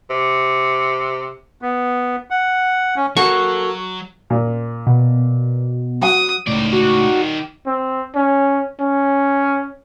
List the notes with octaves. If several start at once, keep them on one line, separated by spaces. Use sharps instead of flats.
C3
B3
F#5
C#4
F#3 A#3 F#4 A4 C#6
A#2
B2
F#3 F#5 D#6
C#2 A2 D#3 D5
F#4
C4
C#4
C#4